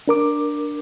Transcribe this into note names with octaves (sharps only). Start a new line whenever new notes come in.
D4 A#4 D6